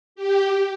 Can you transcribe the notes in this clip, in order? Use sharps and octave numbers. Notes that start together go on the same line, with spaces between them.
G4